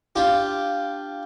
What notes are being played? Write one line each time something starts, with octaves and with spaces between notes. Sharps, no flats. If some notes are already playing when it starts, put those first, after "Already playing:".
D4 F4 G4